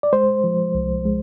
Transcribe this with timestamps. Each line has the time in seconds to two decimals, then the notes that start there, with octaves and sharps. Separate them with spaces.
0.03 D5
0.13 G#3 C5
0.44 F3
0.75 C2
1.06 G#3